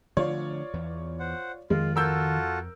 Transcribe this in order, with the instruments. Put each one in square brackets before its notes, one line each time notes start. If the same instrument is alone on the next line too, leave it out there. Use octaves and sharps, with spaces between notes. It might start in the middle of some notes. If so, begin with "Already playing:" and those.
[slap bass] D3 F3 A3 [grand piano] F4 C#5 D5
[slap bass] E2 E3
[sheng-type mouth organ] C5 F#5
[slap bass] F2 [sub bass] D#3 [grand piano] G#3 [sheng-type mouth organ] F4
[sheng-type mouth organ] F4 F#4 A4 [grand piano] A#4 E6 G6